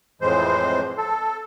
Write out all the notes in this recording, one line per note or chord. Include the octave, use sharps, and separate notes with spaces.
F2 A2 E3 G#3 C5
A4